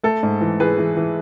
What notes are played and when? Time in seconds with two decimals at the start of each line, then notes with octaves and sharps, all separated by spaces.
0.03 A3 A4
0.23 G#2
0.41 E3
0.60 E3 G#4 B4
0.78 E3
0.97 E3